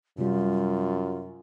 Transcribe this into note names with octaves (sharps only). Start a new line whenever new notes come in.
F#2 C3 G3 F4